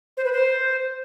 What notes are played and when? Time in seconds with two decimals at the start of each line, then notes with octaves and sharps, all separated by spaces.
0.17 C5
0.25 B4
0.33 C5